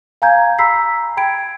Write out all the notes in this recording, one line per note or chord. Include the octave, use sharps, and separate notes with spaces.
F5 G#5 A#5 G6 G#6
A#5 B5 E6 B6 C7
G5 B5 G#6 D7